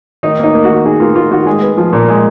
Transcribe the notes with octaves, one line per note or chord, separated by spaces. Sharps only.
D#3 D#4
A#3 D#4
A#3
F#4
D#3
D#3 G#4
A#3 F4
A#3 F4
D#3 F#4
G#3 G#4
B3
F3
A#2
G#3